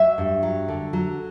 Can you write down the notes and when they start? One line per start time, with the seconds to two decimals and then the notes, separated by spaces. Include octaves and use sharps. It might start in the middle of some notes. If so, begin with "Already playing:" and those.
Already playing: F#3 E5
0.18 G2
0.43 F#3
0.68 D3
0.93 F#3